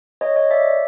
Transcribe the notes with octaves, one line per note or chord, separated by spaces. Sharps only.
C#5 D#5
C#5 D#5
D5 E5